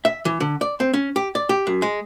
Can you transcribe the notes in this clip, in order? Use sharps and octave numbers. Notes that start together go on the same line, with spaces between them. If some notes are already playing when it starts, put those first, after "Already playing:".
E5
E3
D3
D5
C4
C#4
G4
D5
G4
F#2
G#3